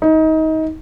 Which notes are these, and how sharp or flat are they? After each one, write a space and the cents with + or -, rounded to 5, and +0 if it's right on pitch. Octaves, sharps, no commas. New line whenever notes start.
D#4 +25